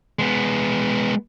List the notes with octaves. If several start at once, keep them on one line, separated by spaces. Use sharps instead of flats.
G#3 B3